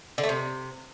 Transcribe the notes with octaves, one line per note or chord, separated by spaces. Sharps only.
D3
A3
C3